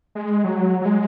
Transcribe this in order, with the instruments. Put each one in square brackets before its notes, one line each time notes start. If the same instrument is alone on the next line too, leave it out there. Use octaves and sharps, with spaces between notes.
[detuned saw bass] G#3
F#3
F#3
G#3